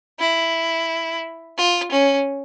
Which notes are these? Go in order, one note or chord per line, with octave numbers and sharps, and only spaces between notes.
E4
F4
C#4